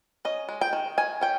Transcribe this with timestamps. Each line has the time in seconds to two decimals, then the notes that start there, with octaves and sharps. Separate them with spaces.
0.25 C#4 D#5
0.49 G#3
0.61 G5
0.73 D#3
0.98 D#3 G#5
1.21 C#4 G5